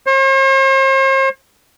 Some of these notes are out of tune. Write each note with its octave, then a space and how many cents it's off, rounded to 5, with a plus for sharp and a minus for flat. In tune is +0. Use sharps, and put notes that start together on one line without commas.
C5 +45